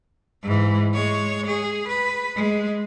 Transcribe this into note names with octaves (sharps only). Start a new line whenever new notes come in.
G#2 E3
G#3 C#5
G#4
B4
G#3